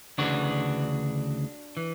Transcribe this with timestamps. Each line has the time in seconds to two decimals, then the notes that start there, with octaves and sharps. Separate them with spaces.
0.18 D2 C#3 E3 D4 F#4
1.77 E3